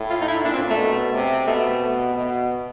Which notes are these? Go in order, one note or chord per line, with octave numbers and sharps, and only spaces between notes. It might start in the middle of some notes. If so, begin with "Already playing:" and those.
Already playing: A2
F4
D#4
E4
A#2 D4
C4
A3
B2
C3
B2 A3
B2